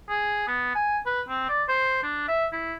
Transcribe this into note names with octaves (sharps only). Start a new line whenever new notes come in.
G#4
B3
G#5
B4
C4
D5
C5
D4
E5
E4